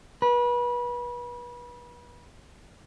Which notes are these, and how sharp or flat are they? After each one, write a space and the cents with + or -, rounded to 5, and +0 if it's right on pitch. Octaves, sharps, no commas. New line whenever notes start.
B4 -30